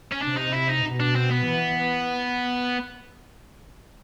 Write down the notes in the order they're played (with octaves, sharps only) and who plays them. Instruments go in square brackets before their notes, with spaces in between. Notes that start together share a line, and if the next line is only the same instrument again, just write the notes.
[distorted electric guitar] C#4
[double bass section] C3 [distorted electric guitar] D4
[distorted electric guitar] D#4
E4
D#4
[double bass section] B2
[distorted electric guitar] D4
C4
B3
[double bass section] E3